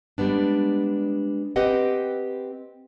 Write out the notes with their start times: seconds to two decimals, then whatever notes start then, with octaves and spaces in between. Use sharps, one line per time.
0.18 G3 G#3 B3 D4
1.56 C4 G4 B4 D#5 F#5